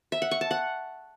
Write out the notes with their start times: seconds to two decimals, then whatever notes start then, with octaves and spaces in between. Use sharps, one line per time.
0.12 E5
0.22 F#5
0.31 C#6
0.41 A5
0.51 F#5